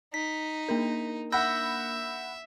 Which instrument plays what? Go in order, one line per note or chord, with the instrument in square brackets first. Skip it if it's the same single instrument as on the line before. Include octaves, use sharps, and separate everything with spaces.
[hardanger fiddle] D#4 [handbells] B6
[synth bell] A#3 D4 A#4
[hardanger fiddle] E5 [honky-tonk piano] F#5 B5 [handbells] E6 G6 A#6